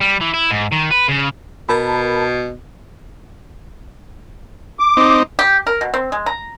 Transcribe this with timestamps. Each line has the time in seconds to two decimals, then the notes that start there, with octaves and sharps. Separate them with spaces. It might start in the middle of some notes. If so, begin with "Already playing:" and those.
0.01 G3
0.21 E3
0.34 E4
0.51 G#2
0.72 D#3
0.91 B4
1.08 C#3
1.69 B2 A#4 A5 B5
4.79 D6
4.97 C4 D#4
5.39 G4
5.67 A#4
5.81 B2
5.94 C4
6.12 G#3
6.26 A#5